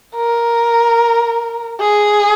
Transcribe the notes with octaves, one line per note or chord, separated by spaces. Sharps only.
A#4
G#4